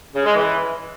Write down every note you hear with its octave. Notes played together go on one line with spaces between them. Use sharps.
C#3
G#3
E3